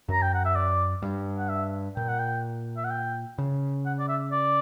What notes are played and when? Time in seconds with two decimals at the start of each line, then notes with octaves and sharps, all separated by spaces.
0.09 F#2 A#5
0.22 G5
0.34 F#5
0.45 E5
0.56 D5
1.02 G2
1.38 F#5
1.49 E5
1.96 A#2 G5
2.09 F#5
2.19 G5
2.77 E5
2.84 F#5
2.90 G5
3.38 C#3
3.86 F#5
3.99 D5
4.09 E5
4.32 D5